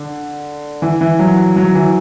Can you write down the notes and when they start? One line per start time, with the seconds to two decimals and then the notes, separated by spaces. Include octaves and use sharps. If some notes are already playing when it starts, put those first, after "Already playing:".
Already playing: D3
0.82 E3
1.01 E3
1.19 F#3
1.56 F#3
1.75 E3